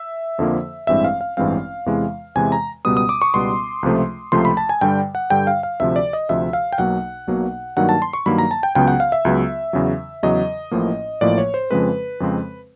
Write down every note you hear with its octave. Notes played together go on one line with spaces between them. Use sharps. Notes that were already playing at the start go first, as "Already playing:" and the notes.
Already playing: E5
F2 D3 F3 A#3
A1 G2 E3 G#3 C4 E5
F5
F5
A1 G2 E3 G#3 C4 F5
E2 C3 E3 G#3
E2 C3 E3 G#3 G#5
A#5
C#2 B2 G3 B3 D#6
D#6
D6
C#6
C#2 B2 G3 B3 C6
C#2 C3 F3 A3
C#2 C3 F3 A3 C6
B5
A5
G#5
G2 D3 G3 G5
F#5
G2 D3 G3 G5
F5
F5
D2 C3 F3 E5
D5
D#5
D2 C3 F3 E5
F5
G5
B1 B2 F#3 A#3 F#5
B1 B2 F#3 A#3
G2 D#3 F#3 A#3 F#5
A5
C6
C#6
G2 D#3 F#3 A#3 B5
A#5
A5
G5
C#2 C#3 F#3 B3 G5
F#5
F5
E5
C#2 C#3 F#3 B3
E2 C#3 F#3
E2 C#3 F#3 D#5
A1 A2 F3 A#3
A1 A2 F3 A#3 D5
C#5
C5
F2 C#3 F3 G#3 C4 B4
F2 C#3 F3 G#3 C4